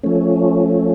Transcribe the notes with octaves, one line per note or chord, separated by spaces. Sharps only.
F3 A3 C#4